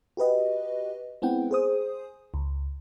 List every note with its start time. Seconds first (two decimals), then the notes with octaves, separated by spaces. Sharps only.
0.17 F#4 G4 B4 D#5
1.22 G#3 B3 C4 E4 F#5 G5
1.51 G#4 C5 D#6
2.34 C#2